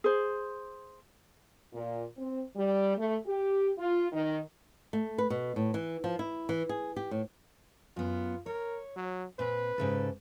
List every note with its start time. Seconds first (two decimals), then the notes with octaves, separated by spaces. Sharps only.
0.04 G#4 C5
1.72 A#2
2.17 C4
2.55 G3
2.96 A3
3.27 G4
3.78 F4
4.12 D#3
4.93 A3
5.18 B4
5.30 B2
5.56 A2
5.74 E3
6.04 F3
6.19 E4
6.49 E3
6.69 G#4
6.96 G4
7.11 A2
7.97 F#2 B3 F4
8.46 A#4 C#5
8.96 F#3
9.39 A#2 C4 B4
9.78 G#2 C#3 A4